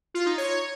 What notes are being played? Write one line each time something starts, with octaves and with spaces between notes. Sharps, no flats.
F4
D#4
C#5